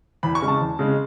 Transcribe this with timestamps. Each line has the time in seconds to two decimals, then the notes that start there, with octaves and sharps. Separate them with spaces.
0.23 E2 B5
0.35 C#6
0.42 C#3 G#3
0.48 A5
0.61 E2
0.79 C#3 G#3